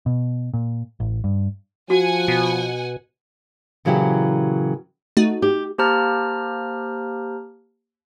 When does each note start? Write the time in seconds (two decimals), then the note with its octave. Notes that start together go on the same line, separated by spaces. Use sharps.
0.06 B2
0.54 A#2
1.00 A1
1.24 G2
1.90 F3 F#4 F#5 G#5
2.28 B2
3.85 A#2 C#3 E3 F#3 E4 G4
5.17 A3 D#4 F#4
5.42 G4
5.78 A#3 G4 C5 A5 A#5 F6